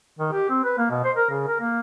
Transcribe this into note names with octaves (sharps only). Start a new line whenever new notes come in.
D#3
G4
C4
B4
A#3
B2
C5
A#4
C#3
A#4
A#3